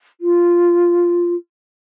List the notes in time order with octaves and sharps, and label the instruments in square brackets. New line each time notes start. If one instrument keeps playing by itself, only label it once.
[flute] F4